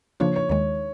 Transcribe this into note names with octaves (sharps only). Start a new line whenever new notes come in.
C#3 F3 A#3 D4 F4 C#5
C#5
D#2 D#3 G#3 C#5